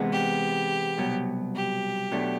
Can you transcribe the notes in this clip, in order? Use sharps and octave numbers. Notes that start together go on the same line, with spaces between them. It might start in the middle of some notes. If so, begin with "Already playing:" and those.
Already playing: C3 E3 G#3 B3
G4
C2 B2 F#3
G4
B2 F#3 A3 D4